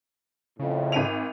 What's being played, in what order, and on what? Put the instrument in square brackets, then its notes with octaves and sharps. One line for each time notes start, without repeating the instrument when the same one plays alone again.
[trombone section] F2 A2 [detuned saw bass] C#3
[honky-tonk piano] G#1 D#7 F7